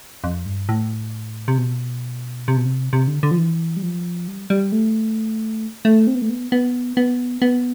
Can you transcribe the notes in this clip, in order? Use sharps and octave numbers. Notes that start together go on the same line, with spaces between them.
F2
G2
A2
C3
B2
C3
B2
C3
C3
D3
D3
F3
E3
G3
F3
G3
G3
A3
A3
C4
B3
A3
B3
B3
B3
B3